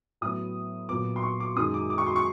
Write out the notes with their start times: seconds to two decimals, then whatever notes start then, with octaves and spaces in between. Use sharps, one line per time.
0.21 A2 F#3 B3 D#6
0.89 A#2 F#3 B3 D6
1.16 C6
1.23 C#6
1.40 D6
1.56 F#2 D#3 G#3 D#6
1.74 D6
1.90 D6
1.98 C#6
2.06 C6
2.16 C#6